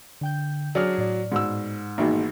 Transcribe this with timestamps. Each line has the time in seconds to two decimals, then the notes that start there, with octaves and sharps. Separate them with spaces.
0.21 D3 G5 G6
0.75 F#3 D4 G#4 F6
0.98 A2 D5
1.32 G#2 B2 E6
1.98 A1 B2 D#3 A#3 D#4 G#4